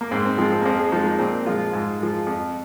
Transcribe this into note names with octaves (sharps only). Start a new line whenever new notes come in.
A#3
G#2 C4
C4
F3 G#3 C4
C4
A#3
F2 C4
G#4
F3 G#3 D#4
A#3
A#2 C4
F3 G#3 F4
G#2
F3 G#3
F2